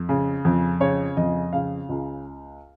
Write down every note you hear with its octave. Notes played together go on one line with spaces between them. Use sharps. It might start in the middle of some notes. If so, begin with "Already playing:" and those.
Already playing: F2
C#3
F2
C#3 C#5
F2 D#5
C#3 F5
C#2